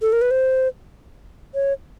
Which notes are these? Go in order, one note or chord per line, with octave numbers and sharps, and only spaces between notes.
A4
A#4
B4
C5
C#5